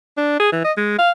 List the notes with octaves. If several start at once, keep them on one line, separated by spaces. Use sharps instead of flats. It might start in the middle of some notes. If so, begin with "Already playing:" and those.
D4
G#4
E3
D#5
G#3
F5